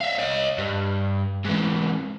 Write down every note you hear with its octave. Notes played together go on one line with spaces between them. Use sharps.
E5 F5
C#5 D#5
G2
G#2 E3